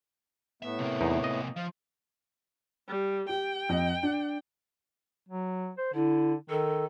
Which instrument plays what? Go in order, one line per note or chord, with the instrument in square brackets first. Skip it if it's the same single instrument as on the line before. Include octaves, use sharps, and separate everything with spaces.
[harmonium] A2 A3 B3 [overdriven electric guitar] E5
[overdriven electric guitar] C3 A#3
[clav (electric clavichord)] E2 D#4
D#5
[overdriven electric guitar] F3 [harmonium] F5
[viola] G3
[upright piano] G4 [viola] G5
[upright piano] F2 D#5
D4
[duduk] F#3
C5
[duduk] D3 [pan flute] E4
[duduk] D#3 [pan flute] A4